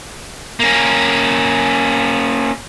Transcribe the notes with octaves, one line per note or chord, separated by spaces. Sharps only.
A#3 C#4